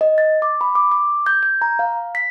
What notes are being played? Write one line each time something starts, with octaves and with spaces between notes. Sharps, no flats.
D#5
A6
D6
B5
D6
D6
G6
G6
A#5
F5
B6